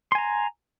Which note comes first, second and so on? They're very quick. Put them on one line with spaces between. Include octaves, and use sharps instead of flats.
C6 G#5 A#5